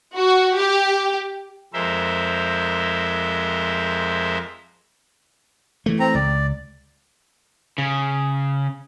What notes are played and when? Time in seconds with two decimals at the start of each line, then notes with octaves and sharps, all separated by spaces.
0.16 F#4
0.57 G4
1.73 F2 G#3 A#4 C5 E5
5.86 E3 A3
6.00 C4 A#5
6.14 C#2 D5
7.78 C#3